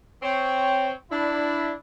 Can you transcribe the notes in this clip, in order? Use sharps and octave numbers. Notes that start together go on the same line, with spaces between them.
C4 C#5
D4 E4